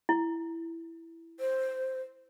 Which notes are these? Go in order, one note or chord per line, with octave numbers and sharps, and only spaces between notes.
E4
C5